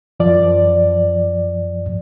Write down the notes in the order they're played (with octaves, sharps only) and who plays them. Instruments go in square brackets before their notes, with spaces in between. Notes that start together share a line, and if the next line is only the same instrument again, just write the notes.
[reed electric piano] F#2 F3 D5